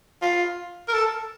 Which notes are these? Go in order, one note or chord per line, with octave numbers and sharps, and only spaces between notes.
F4
A#4
A4